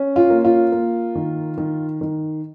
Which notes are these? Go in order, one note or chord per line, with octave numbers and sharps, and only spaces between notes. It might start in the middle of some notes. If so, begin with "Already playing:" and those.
Already playing: C#4
F4
A#3
F4
A#3
D#3
D#3
D#3